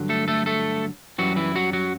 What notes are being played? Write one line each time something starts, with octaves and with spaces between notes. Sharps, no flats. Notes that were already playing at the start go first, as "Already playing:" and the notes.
Already playing: G2 D3 F#3
A3 A4
A3 A4
A3 A4
F#2 E3 F#3 G3 F#4
E3 E4
F#3 F#4
F#3 F#4